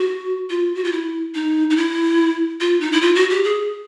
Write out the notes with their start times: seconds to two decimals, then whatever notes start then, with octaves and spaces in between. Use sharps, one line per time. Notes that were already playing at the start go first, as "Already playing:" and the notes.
Already playing: F#4
0.50 F4
0.75 F#4
0.84 F4
0.92 E4
1.35 D#4
1.70 D#4
1.77 E4
2.61 F4
2.80 D#4
2.92 E4
3.01 F4
3.16 F#4
3.30 G4
3.44 G#4